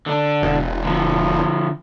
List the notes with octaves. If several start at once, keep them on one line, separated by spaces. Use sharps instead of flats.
D3 D4
E1
D3 F3